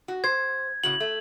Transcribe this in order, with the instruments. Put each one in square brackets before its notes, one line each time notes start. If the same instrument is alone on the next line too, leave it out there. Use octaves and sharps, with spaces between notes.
[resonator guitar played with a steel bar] F#4
[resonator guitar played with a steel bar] C5 [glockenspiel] G#6
[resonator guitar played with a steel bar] A2 C#3 F#4 [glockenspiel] F#7
[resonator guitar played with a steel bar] A3